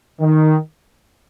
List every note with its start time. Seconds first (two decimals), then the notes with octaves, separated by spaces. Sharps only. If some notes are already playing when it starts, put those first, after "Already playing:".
0.20 D#3